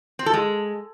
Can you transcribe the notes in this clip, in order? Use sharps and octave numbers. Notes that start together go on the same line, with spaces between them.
C4
A4
G#3